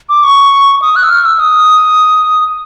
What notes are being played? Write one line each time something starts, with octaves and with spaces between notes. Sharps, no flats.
D6
C#6
D#6
F#6
E6
F6
E6
D#6